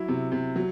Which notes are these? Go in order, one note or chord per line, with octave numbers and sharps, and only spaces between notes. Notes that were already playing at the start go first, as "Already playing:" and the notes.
Already playing: F#3 E4
C3
C3
F#3